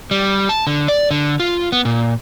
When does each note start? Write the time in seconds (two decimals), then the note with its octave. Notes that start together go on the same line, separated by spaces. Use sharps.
0.11 G3
0.49 A5
0.67 D3
0.88 D5
1.11 D3
1.40 F4
1.72 B3
1.85 A#2